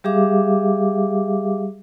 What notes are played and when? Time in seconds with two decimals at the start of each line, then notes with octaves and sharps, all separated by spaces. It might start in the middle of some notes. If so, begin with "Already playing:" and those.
0.04 G3 G4 G#4 E5 F5 D6